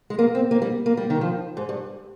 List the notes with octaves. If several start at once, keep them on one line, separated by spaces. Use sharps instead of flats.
G#3
A#3
C4
A#3
G3
A#3
G3
D#3
F3
G#2
G2